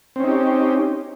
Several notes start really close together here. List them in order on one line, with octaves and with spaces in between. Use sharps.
C4 C#4 D#4 G4